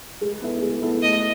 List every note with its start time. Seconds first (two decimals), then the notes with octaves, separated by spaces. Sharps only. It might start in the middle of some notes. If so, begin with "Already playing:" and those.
0.21 G#3
0.42 B3 E4 A4 E5
0.62 G#3
0.83 B3 E4 A4 E5
1.02 A3 D#5